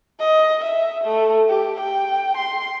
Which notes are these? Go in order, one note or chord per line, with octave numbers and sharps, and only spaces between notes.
D#5
E5
A3
G4
G5
C6